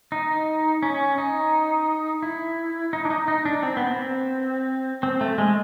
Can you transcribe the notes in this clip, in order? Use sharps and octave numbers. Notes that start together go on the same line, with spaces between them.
D#4
C#4
D#4
E4
D#4
D4
D#4
D#4
D4
C4
B3
C4
C4
A3
G#3